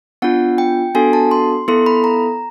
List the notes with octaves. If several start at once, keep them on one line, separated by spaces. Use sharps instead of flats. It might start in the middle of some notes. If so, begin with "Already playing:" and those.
B3 D4 F4 F#5
G5
B3 D4 F#4 A4 G#5
A5
C6
B3 E4 A4 C6
B5
A#5